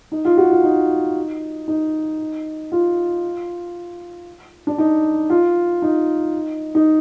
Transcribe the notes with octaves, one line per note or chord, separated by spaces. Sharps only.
D#4
F4
F#4
F4
D#4
D#4
F4
D4
D#4
F4
D#4
D#4